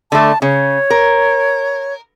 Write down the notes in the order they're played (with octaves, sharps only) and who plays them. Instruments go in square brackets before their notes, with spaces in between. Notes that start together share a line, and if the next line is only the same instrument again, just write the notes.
[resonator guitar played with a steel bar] D3 A3 [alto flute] A5
[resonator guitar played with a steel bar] C#3 [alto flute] C#5
[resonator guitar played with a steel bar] A#4